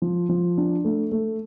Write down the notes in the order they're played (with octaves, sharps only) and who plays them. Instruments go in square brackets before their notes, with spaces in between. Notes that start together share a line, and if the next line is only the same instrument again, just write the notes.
[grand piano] F3
F3
D4
A3
A3